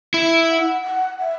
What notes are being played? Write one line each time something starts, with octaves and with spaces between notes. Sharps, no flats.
E4
F#5
F#5
E5